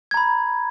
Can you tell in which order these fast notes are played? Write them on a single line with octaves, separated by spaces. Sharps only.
G#6 A#5 B5